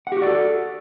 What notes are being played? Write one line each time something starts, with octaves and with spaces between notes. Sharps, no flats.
F#4 G4 A4 D5 F#5